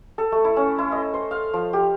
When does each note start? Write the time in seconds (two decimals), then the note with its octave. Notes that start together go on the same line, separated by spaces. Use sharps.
0.18 A4
0.32 A3
0.45 E4
0.57 C#4
0.78 E4
0.92 D#5
1.14 C5
1.31 F5
1.54 F3
1.73 G4